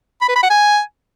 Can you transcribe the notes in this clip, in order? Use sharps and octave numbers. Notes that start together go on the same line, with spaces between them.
B5
B4
B5
F#5
G#5